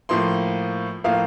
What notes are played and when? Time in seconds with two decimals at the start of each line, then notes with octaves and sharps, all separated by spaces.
0.09 A2 F3 A#3 C6
1.04 A2 F3 A#3 F5